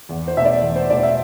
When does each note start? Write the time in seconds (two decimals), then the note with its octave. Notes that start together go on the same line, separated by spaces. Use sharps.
0.09 E2
0.28 C5
0.36 B2 E5
0.40 A3 D5
0.62 E2
0.76 C5
0.90 B2 A3 D5
1.03 E5